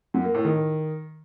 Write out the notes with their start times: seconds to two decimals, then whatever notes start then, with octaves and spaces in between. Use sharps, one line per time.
0.14 F#2
0.24 A#3
0.34 A2
0.45 D#3